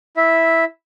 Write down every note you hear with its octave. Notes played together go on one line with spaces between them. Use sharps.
E4 E5